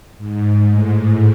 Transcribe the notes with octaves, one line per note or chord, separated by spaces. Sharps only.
G#2
A2